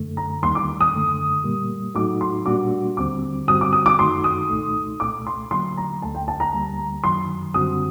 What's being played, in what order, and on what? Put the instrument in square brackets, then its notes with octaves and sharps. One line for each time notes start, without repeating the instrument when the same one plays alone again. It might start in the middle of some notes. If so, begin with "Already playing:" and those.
Already playing: [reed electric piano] F#2 D3 A3
[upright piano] A#5
[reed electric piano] D#2 D#3 G3 A#3 [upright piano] C6
[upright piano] D6
D#6
[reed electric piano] F#2 D3 A3
A#2 G3 A#3
[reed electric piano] A2 F#3 A3 D#4 F#4 [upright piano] D6
[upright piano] C6
[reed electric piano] A#2 G3 A#3 D4 F#4 [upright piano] D6
[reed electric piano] D#2 D3 G3 C4 [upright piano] D6
[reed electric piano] G2 D3 G3 C4 F#4 [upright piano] D#6
[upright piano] D6
D#6
D6
[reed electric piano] F#2 D#3 A3 D#4 F#4 [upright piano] C6
[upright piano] D#6
[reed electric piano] C2 A#2 A3 D#4
[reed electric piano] C2 A#2 A3 [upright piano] D6
[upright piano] C6
[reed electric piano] D3 F#3 A#3 [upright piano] C6
[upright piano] A#5
[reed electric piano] D2 D3 A3 [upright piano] A5
[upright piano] G5
A5
A#5
[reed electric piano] D2 D3 G3 A#3
[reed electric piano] F#2 D#3 F#3 [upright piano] C6
[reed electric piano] F#2 D3 G3 C4 F#4 [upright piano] D#6